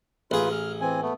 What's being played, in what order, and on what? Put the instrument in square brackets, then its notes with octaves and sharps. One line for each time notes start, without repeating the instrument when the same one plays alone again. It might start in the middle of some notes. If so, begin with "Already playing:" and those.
[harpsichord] A1 G#4 [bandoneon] F4 B4
[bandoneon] F6
E3 C4 G#5
A3 B3